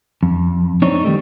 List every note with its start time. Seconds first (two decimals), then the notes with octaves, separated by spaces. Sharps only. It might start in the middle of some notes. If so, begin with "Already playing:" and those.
0.23 F2
0.82 C4 D4 D#4 C#5
1.04 D#3 G3 A3